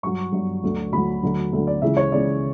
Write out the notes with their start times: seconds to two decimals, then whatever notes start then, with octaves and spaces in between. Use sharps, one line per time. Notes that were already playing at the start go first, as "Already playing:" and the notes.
0.03 G2 F#3 C#6
0.33 G2 F#3
0.63 D2 D3 F#3
0.93 D2 D3 F#3 B5
1.23 D2 D3 F#3
1.53 D2 D3 F#3
1.67 D5
1.82 C#2 C#3 E3 E5
1.97 C#5
2.12 C#2 C#3 E3 D5